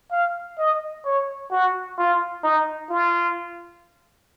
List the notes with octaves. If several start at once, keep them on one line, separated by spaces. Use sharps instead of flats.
F5
D#5
C#5
F#4
F4
D#4
F4